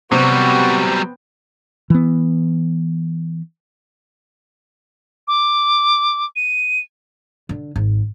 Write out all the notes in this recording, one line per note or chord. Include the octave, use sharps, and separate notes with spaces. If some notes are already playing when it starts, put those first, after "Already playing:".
C3 F#3 G3 B3 C4 F#4
E3 B3
D6
D#7
D3
G#1